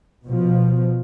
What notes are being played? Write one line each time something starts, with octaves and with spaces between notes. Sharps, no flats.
B2 F3